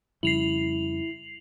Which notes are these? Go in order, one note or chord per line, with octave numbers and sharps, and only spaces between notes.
F2 C#3 G3 E4 C7 F7 F#7